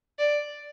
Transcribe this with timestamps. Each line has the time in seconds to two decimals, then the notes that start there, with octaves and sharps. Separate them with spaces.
0.19 D5